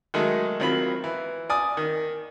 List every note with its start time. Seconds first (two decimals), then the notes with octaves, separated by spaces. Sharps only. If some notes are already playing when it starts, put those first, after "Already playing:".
0.14 D#3 F#3 G#3 A3
0.60 D#3 F#3 C4 F4 B5
1.04 E3
1.50 D5 G#5 D#6
1.77 D#3